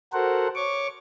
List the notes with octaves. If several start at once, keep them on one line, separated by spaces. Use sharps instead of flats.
F#4 A4 A#4 C5 F#5
C#5 C#6 D6